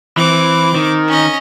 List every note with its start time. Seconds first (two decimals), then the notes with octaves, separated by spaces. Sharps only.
0.17 E3 C4 D6
0.75 D#3
1.08 C#4 D#5